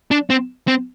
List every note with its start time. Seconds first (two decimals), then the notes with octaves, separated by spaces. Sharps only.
0.11 D4
0.30 C4
0.68 C4